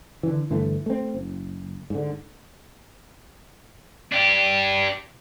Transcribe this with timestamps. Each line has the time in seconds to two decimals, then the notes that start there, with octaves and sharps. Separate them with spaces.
0.23 D3 E3
0.50 G2 D3 E3 A3
0.86 A3 C4
1.14 F#1
1.90 G#2 D3
4.12 D4 G4